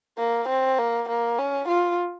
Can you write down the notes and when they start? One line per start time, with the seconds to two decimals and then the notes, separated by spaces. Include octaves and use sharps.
0.18 A#3
0.49 C4
0.78 A#3
1.09 A#3
1.39 C#4
1.69 F4